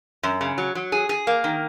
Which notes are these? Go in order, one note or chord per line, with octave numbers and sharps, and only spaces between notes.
F#2
C#3
F#3
F#3
G#4
G#4
A#3
D#3